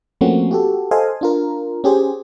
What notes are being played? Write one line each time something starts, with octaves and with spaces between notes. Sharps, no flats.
F3 A3 A#3 C4 C#4 F#4
F#4 G4 A4
A4 C5 D#5 F5 G#5
D4 F4 A#4
C#4 G4 G#4 C5